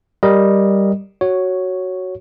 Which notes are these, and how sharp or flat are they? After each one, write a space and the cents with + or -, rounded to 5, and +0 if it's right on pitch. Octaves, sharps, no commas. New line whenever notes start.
G3 +0 A#4 +0 D#5 +0
F#4 +5 C#5 +0